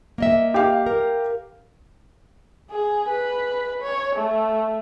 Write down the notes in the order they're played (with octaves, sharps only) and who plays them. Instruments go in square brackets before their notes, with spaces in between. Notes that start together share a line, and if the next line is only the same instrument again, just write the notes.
[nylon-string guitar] A#3 D#5 E5
[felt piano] G4 F5
[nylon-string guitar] A#4
[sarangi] G#4
B4
C#5
A3